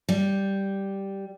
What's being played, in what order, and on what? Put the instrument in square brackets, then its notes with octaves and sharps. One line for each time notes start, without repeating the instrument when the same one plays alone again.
[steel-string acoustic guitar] G3